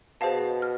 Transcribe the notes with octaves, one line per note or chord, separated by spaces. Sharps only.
B2 G#4 C5 F5 A5
F6